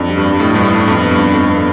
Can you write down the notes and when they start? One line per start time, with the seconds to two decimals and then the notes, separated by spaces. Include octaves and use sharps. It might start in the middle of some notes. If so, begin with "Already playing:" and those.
Already playing: F2 D4
0.09 G3
0.18 G2
0.25 G3
0.40 A2 G3
0.55 G2 G3
0.63 A2
0.72 D4
0.87 F2 B3
1.03 B3
1.11 G2
1.19 D4
1.34 F2 A4
1.50 B3